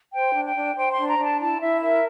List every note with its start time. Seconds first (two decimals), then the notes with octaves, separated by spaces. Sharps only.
0.14 C5 G5
0.35 D4
0.45 G5
0.55 D4
0.77 C5 G5
0.92 C6
0.98 D4
1.08 A#5
1.20 D4 A5
1.40 E4 A5
1.61 E4 E5
1.82 A#4 E5